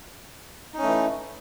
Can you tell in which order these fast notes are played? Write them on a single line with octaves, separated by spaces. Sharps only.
D#4 C#4 A3 E3